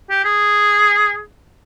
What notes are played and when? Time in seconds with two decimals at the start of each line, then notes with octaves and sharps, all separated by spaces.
0.10 G4
0.25 G#4